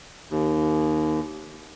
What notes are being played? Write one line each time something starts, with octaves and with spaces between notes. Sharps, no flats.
D#2